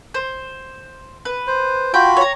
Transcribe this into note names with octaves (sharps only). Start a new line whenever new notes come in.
C5
B4
C5
F4 F#4 G5 B5
C#5 A#5